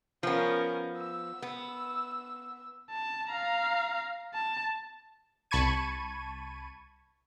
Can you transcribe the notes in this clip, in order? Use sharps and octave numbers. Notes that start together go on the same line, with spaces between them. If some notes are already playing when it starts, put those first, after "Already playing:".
F3 B3 C#4 A#4
E6
B3
A5
F5 A#5
A5
C2 A5 B5 C#6 G#6 D#7